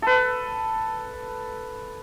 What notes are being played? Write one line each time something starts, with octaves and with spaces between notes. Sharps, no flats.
A4 B4